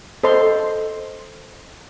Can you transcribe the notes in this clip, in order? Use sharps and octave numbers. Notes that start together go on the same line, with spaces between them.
A4 C5 D#5 C6